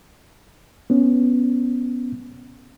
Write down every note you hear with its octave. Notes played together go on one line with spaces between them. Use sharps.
B3 C#4